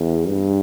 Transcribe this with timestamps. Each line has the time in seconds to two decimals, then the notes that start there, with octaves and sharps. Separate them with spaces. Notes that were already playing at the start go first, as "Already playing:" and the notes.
Already playing: E2
0.27 G2